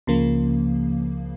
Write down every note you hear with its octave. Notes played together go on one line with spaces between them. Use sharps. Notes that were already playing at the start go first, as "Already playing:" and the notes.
C#2 C#3 F3 A#3